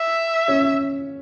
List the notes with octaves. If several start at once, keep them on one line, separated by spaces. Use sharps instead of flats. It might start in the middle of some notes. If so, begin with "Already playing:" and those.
Already playing: E5
C#4